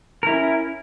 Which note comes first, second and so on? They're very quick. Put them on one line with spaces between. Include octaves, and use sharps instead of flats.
A#4 E4 C#4